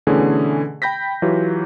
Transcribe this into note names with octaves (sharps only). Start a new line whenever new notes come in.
B2 D3 E3 A3 C#4 G#4
G5 B5 G6 A#6 B6
E3 F#3 F4 G4